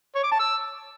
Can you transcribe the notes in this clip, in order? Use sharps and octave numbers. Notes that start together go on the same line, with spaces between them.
C#5
D6
A5
E6